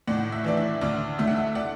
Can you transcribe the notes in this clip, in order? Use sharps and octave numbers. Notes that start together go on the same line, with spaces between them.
A2 D5 F#5
E5
E3 D4 D5
E5
D2 D5
D3 A3 E5
F#5
E5
D5 F#5